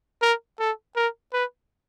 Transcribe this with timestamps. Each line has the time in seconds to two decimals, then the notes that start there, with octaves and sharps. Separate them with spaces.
0.22 A#4
0.60 A4
0.96 A#4
1.33 B4